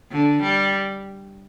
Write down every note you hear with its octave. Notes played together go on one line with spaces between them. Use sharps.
D3
G3